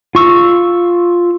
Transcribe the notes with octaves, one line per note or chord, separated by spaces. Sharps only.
F4 C#6 E6